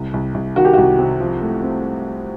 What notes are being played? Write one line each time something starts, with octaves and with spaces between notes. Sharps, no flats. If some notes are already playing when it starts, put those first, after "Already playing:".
Already playing: C2
C2
C2
D#3 F#4
G4
C2 F#4
C3
F3
A3
C4